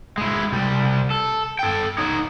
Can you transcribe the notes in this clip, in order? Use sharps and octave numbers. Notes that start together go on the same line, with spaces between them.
G#3 E4
C2 G3
A4
A4 G5
D#4 C#5